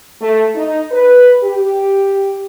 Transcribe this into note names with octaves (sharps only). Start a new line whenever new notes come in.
A3
D#4
B4
G4